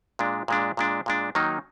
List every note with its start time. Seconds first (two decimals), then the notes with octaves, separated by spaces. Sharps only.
0.19 A#2 G#3 D4
0.48 A#2 G#3 D4
0.77 A#2 G#3 D4
1.06 A#2 G#3 D4
1.35 D#3 F#3 A#3 D#4